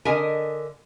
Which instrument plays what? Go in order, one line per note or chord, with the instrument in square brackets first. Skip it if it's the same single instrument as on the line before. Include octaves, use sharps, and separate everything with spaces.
[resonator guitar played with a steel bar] D3 A#4 D#5 E5 G#5